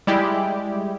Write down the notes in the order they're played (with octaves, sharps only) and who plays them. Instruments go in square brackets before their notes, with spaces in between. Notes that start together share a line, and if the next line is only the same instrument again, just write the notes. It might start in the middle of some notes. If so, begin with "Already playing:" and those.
[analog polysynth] G3 G#3 E4 G4